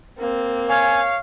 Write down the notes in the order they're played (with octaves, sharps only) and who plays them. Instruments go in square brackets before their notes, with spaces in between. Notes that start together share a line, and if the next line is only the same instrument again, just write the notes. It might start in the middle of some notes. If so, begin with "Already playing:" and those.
[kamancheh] A#3 C4
[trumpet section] C#5 F5 [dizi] G#5